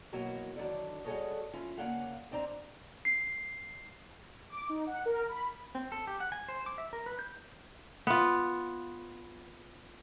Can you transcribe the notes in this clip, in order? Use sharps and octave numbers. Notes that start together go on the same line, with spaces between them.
B2 E3 F#3 A#3 F#4
D3 D#3 F#3 D4
G3 F#4 G#4 A4 C#5 D#5
E3 C#4 F4
C#3 A#3 C#4 D4 F5 F#5
G#2 C4 D4 C5 A#5
C7
D6
D#4
F#5
A#4
B5
C4
A4
G4
F#5
G#5
C5
D6
E5
A#4
B4
G6
B3 F4